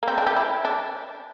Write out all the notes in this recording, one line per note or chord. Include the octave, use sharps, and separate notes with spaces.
A#3
C4
D4
G4
E4
D4